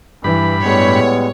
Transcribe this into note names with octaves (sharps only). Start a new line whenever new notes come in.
G2 E3 B5
A2 G3 G#3 B3 C#5